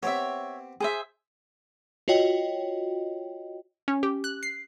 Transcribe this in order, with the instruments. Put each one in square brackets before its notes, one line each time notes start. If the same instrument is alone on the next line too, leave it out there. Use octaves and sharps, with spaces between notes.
[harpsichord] B3 C4 G4 [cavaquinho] C#5 E5
[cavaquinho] G#4 C5 E5
[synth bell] F4 F#4 C#5 D#5 G5
[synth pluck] C#4
G4
F#6
C7